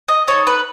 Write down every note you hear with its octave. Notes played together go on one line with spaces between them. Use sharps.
D#5
D#4 A4 C#5
B4